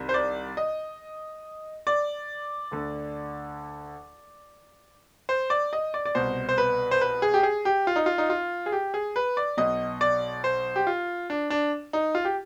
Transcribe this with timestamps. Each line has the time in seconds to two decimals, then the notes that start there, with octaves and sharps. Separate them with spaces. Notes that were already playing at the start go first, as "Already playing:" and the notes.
Already playing: C2 C3 D#3
0.09 C5
0.14 D5
0.57 D#5
1.87 D5
2.72 D2 D3
5.29 C5
5.50 D5
5.73 D#5
5.94 D5
6.05 D5
6.15 C2 B2 C5
6.49 C5
6.58 B4
6.91 C5
7.01 B4
7.22 G#4
7.34 G4
7.43 G#4
7.65 G4
7.87 F4
7.96 D#4
8.06 F4
8.18 D#4
8.30 F4
8.66 G#4
8.72 G4
8.94 G#4
9.16 B4
9.37 D5
9.57 B1 B2 D#5
10.01 D5
10.44 C5
10.76 G4
10.87 F4
11.30 D4
11.50 D4
11.93 D#4
12.15 F4
12.25 G4